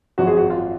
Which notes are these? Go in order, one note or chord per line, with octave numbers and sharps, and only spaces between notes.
G#1 F#2 F3 F#4
G#4
F#4
F4